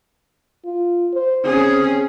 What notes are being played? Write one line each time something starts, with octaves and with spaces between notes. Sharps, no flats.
F4
C5
C4 C#4 G#4